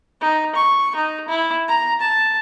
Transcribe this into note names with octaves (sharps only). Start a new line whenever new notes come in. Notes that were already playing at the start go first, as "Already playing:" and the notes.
D#4
C#6
D#4
E4
A#5
A5